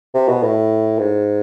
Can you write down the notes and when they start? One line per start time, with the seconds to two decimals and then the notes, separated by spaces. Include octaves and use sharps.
0.14 C3
0.28 B2
0.43 A2
0.99 G#2